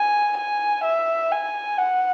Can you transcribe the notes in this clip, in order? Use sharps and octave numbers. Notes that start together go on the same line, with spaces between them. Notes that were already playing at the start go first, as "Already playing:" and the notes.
Already playing: G#5
G#5
E5
G#5
F#5